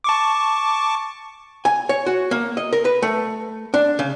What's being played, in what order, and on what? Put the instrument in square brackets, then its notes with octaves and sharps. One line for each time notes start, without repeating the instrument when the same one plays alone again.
[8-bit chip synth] A5 C#6 D6
[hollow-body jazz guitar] G#5
C#5
F#4
A#3
D#5
A#4
B4
A3
D4
C#3